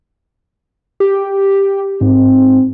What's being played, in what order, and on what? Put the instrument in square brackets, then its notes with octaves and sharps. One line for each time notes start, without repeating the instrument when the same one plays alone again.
[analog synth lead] G4
[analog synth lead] G#2 [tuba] C4